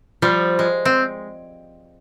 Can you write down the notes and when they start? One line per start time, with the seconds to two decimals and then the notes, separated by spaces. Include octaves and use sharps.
0.22 F3 G3
0.59 G#3
0.85 C4